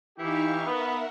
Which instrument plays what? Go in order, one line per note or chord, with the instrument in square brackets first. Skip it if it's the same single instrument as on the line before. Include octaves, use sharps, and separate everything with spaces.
[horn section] E3 E4 G4 [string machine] D#4 F5 C#6
[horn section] B3 [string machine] A#4 E5 F#5